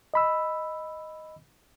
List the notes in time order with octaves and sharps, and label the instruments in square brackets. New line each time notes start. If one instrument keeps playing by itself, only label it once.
[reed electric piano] D#5 B5 E6